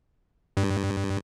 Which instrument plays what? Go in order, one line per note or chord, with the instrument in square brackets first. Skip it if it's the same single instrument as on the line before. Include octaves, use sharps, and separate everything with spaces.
[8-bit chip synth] G2